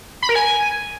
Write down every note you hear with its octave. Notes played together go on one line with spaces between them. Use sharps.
B5
A#4
G#5